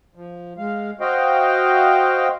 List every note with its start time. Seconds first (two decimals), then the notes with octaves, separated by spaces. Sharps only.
0.15 F3
0.58 G#3 F5
1.01 F#4 C5 D#5 F5 G5